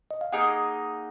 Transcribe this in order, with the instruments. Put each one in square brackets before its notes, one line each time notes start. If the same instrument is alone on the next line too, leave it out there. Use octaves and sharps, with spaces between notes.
[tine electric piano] D#5
F5
[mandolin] A#3 D#4 G#4 D#5 [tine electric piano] F#5